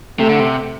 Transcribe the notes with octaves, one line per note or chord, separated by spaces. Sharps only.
C3 A3
D3
C3